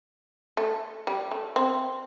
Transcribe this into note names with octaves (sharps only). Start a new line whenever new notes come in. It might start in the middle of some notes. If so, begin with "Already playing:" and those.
A3
G3
A3
C4